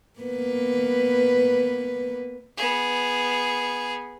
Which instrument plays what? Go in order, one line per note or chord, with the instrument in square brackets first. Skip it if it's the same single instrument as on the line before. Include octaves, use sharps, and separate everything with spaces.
[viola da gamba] A#3 B3 B4
[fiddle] B3 G#4